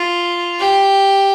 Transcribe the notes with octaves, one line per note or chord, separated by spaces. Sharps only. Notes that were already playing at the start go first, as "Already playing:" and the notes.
Already playing: F4
G4